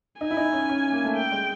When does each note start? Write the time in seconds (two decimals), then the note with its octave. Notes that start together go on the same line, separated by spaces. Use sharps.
0.21 D#4 G#5
0.31 E4
0.37 D#4
0.53 C#4
0.69 C#4
0.92 A#3
1.05 A3
1.16 G5
1.32 G#3